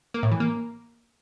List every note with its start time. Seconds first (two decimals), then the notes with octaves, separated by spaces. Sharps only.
0.14 A#3
0.23 A2
0.32 E3
0.40 A#3